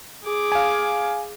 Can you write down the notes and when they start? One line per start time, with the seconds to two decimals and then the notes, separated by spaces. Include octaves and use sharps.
0.23 G#4 D6
0.52 F5 G#5